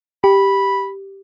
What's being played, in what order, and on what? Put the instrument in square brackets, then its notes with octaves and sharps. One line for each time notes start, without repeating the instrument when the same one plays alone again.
[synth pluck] G4 [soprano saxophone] B5